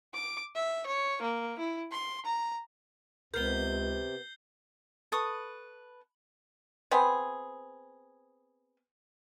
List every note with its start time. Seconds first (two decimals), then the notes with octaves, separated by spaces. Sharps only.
0.14 D6
0.55 E5
0.86 C#5
1.22 A#3
1.59 E4
1.92 C6
2.25 A#5
3.34 C#2 C3 B3 A#4 G6 C7 G7
5.12 A4 B4 C#6 D#6
6.91 B3 C4 G#4